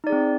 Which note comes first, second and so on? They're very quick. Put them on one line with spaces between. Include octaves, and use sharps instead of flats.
D#4 D5 G#4 C4